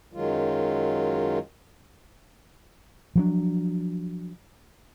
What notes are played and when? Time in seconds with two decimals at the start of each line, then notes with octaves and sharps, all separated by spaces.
0.13 F#2 D#3 F#3 G#3 F4
3.15 F3 F#3 D4